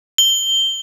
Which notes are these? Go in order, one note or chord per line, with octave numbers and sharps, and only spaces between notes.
G7